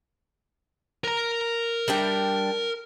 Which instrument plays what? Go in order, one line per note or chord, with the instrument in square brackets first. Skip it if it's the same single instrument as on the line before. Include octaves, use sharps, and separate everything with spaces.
[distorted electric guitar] A#4 A#5
[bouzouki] G3 D4 G5